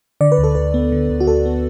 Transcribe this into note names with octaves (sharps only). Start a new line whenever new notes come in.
D3 D5
B4
D2
A4
D2 B4
B3
D3
D2
F#4
D2 A4
B3